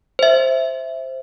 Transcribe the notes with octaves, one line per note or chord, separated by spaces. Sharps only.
C5 E5